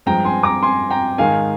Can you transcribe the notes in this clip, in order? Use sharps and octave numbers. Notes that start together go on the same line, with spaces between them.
G2 F3 G#3 G5 A#5
G#5 C6
A#5 D6
G#5 C6
G5 A#5
G#2 D#3 G#3 F5 G#5